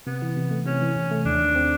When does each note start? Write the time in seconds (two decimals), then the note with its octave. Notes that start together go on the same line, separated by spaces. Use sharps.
0.07 C3 B3
0.22 E3
0.36 C3
0.51 A3
0.66 C3 C#4
0.82 E3
0.96 C3
1.11 A3
1.25 D#2 D4
1.41 D#3
1.55 C4